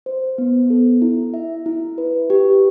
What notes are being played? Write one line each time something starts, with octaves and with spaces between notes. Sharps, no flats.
C5
B3
A4
E4
E5
E4
B4
G4